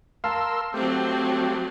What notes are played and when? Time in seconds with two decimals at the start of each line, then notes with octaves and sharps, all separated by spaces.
0.24 A#4 F5 A5 C6 E6
0.74 F#3 A3 C4 G4